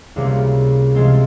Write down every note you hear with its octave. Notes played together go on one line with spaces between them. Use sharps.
C#2 C3 G3 A#3
C3 F3 G#3 C4